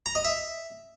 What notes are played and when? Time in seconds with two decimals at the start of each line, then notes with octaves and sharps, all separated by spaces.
0.06 A#5
0.15 D#5
0.25 E5